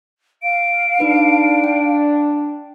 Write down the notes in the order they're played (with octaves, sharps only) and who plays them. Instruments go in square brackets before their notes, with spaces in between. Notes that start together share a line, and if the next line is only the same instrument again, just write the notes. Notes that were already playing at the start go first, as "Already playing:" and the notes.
[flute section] F5 [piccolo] D7
[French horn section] D4 [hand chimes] D#4 B4
[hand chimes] G5